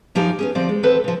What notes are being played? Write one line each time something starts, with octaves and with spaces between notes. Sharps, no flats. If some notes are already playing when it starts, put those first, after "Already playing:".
F#2 F3 D#4 G4 G#5
B3 C#4 G#4
D2 F3 C4 D5
G#3
D#2 E3 C4 A4 B4 C5
C#3 F3